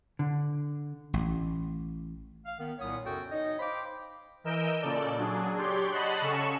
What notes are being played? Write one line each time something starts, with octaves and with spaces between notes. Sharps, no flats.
D3
A1
F5
D#3 B3
C2 A#2 B3 C#5 D#6
F#2 C#3 F#4 A4 G5
D#4 C#5 D#5
C5 F5 G5 B5 D6
E3 A#4 D#5 E6 G6 D7
A#2 C#3 A4 D5
F#3 D4 G#4
G4 C#5 D5 C6
D#5 F#5 A5 B5 F#6 C7
C#3 C#4 A4 C#6 E7